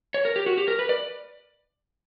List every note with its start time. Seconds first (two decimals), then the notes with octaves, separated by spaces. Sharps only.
0.14 C#5
0.25 A#4
0.36 G4
0.46 F#4
0.57 G4
0.68 A#4
0.79 B4
0.89 D5